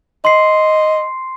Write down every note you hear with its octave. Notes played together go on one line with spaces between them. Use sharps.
D#5 C6 C7